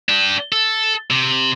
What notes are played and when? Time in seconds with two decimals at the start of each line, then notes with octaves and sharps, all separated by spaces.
0.09 D4 G4
0.52 A4
1.10 C3